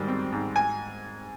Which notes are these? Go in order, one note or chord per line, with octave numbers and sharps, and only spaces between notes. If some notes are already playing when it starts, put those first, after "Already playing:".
Already playing: G#2 D#3 G3
C4
G#2
G#5